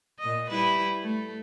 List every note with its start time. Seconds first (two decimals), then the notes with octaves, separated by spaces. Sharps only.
0.19 A#2 D#5
0.51 G3 E4 B4
1.03 A3